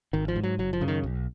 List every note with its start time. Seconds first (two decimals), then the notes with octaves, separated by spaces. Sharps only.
0.13 G#1 D#3
0.28 F3
0.36 G#2
0.43 F#3
0.58 F#1 F#3
0.73 F3
0.81 F#2 C#3
0.88 D#3
1.03 B1